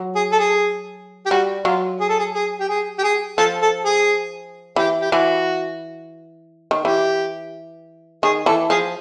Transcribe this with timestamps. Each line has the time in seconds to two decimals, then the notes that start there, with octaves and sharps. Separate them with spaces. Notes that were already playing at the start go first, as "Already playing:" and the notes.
Already playing: F#3
0.15 G#4
0.32 A4
0.39 G#4
1.26 G4
1.30 G3 F#4
1.65 F#3 F4
2.00 G#4
2.09 A4
2.19 G#4
2.34 G#4
2.60 G4
2.69 G#4
2.98 G4
3.04 G#4
3.38 F3 A4
3.62 A4
3.85 G#4
4.76 E3 G4
5.01 G4
5.11 E3 F#4
6.71 D#3
6.85 E3 G4
8.23 D#3 G#4
8.46 E3 A4
8.70 F3 G#4